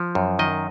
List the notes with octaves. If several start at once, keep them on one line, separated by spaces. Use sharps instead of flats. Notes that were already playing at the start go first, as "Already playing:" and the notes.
Already playing: F3
F#2
D#3 D#5